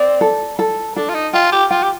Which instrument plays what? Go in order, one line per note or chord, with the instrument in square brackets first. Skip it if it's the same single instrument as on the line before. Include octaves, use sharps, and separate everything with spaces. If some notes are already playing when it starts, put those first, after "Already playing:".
Already playing: [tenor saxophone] C4 [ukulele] D5
[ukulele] A4
A4
[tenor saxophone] D4 [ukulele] A4
[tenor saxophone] F4
D#4
[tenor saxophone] F4 [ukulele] G5
[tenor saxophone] G4
[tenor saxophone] F4 [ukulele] G5
[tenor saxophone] G4